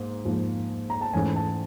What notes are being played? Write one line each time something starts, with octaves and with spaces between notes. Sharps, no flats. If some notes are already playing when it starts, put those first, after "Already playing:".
Already playing: G#2 A#3
G#2 F3 A#3
A#5
A5
G#2 E3 A3 C#4 G#5
A5